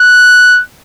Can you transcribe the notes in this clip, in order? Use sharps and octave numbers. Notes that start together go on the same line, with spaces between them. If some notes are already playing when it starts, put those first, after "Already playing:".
Already playing: F#6